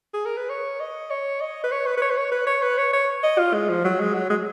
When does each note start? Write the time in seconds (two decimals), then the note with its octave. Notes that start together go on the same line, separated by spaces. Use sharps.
0.14 G#4
0.26 A#4
0.37 B4
0.49 C#5
0.80 D#5
1.10 C#5
1.41 D#5
1.64 B4
1.72 C#5
1.86 B4
1.97 B4
2.02 C#5
2.11 B4
2.17 C#5
2.32 B4
2.47 C#5
2.62 B4
2.78 C#5
2.93 C#5
3.23 D#5
3.38 F4
3.54 G#3
3.69 F3
3.85 F#3
4.00 G#3
4.14 F#3
4.30 G#3